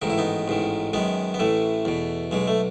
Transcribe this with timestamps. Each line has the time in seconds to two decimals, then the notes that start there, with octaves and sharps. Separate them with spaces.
0.02 A1 G#2 D#3 D#4
0.10 E4
0.18 B3 D#4
0.48 A1 G#2 D#3
0.93 F#2 D#3 G#3 B3
1.34 B3
1.39 A1 A2 E3 A3
1.85 E2 B2
2.31 B1 B2 G#3
2.47 A3